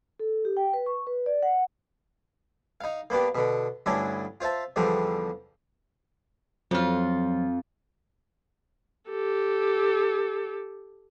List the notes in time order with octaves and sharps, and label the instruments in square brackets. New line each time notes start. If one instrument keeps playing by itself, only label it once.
[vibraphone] A4
G4
G5
B4
C#6
B4
D5
F#5
[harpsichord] D#4 F5
A#3 B3 D4 G4
B2 D3
D2 G2 C#4 D4 E4
F4 C5 E5 A5
E2 D3 F3 G3 C4
[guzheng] F2 F4 [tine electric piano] F3 F#3
[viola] G4 A4